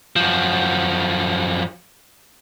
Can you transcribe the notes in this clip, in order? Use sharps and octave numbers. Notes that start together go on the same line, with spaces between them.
F#2 F3